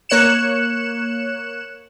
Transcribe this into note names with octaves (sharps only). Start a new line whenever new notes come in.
A#3 C#5 F#6 C#7 E7